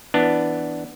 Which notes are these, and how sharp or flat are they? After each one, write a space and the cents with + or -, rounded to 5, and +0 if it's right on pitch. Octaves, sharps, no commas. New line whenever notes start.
E3 +0 B3 +0 D4 +0